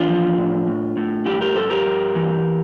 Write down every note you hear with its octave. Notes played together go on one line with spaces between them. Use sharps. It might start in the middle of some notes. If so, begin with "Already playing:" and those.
Already playing: E2 D4 F4
F3
A2
A2
A2
G2 E4 G4
G4 A#4
G2 A4 C5
G4 A#4
G2
E3